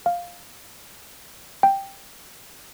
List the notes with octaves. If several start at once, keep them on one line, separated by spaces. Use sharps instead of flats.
F5
G5